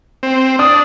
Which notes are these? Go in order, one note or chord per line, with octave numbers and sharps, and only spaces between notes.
C4
D4 D#6